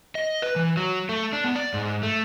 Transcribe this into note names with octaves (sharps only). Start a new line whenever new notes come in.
D#5
B4
E3
F#3
A3
D4
B3
D5
G#2
A3